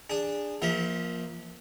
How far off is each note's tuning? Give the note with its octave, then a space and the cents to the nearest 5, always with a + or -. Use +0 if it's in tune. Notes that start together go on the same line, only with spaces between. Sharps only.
D4 +0 G#4 -20
F3 +0 A#3 +20 E5 -30